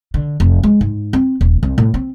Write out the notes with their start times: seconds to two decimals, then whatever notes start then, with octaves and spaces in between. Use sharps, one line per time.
0.14 D3
0.40 F1
0.63 G#3
0.81 G#2
1.13 C4
1.41 D#1
1.63 C2
1.78 A2
1.94 C4